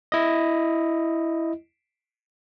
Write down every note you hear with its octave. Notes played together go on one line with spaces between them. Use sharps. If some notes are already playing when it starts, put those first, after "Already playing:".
E4 D#5